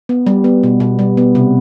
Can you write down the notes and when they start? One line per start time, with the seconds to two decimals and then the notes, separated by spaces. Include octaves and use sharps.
0.09 B3
0.27 G3
0.44 B3
0.63 B2
0.80 B2
0.99 G3
1.17 B3
1.35 C3